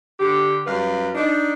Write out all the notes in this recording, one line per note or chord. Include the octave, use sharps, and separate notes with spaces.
D3 G4
F#2 G3 B4 F5
D4 D#4